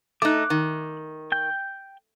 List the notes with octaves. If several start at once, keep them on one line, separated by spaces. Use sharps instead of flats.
A3 D#4 D6 F#6
D#3
G5 G6